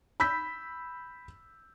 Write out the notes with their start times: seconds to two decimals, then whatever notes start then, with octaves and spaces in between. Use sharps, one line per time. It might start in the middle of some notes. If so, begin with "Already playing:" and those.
0.20 B5 E6 G6 B6